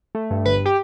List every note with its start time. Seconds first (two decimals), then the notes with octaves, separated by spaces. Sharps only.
0.15 A3
0.31 G2
0.46 G1 B4
0.66 G4